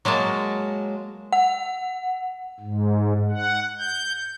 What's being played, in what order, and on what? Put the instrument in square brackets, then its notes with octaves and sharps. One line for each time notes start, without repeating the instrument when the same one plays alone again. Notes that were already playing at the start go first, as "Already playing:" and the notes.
[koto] F#3 G#3 A#3 A5
[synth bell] F#5
[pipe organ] G#2
F#5
G6